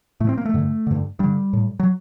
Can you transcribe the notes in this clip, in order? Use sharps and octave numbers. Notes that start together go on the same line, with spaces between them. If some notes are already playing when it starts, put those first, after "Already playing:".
A2 A3
C4
A#3
A3
G2 D3
G2 D3
G2 D3 G3
A2
F#3